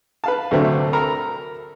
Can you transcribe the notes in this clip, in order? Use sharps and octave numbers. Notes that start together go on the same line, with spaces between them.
B4 F5 A5
D2 C3 F#3 A3 C4 D4
A4 A#4 A#5 B5